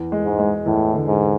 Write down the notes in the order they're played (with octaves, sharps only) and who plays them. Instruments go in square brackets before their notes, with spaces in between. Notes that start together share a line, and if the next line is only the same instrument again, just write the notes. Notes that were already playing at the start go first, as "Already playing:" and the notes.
Already playing: [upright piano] E2
G#3
[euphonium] G#2
[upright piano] G#3
[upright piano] E2 [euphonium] A2
[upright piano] D3
[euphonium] G#2